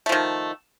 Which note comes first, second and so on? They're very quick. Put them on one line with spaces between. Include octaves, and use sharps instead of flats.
A3 F3 D#3